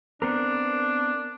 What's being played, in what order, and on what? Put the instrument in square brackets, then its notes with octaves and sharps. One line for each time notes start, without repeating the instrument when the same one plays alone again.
[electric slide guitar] B3 C4 A#4 [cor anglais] D4